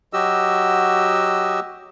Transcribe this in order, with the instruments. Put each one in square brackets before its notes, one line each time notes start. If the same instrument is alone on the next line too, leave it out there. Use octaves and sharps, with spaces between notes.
[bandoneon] F#3 F#4 G4 D#5 E6